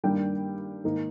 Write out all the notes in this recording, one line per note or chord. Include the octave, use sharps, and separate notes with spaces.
G2 D#3 G3 A#3 D4 G5
G#2 D#3 A#3 D#4